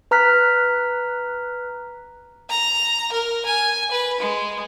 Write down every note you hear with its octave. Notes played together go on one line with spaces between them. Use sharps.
B4 A#5 F6 F#6 B6
A#5
A#4
G#5
B4
G#3